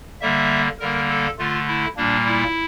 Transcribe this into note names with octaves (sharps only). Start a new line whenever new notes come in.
D3 G3 A#3 E5
D3 G3 A#3 A#4
A4
D3 A3 F4
E4
A#2 G3 A#3 D4
E4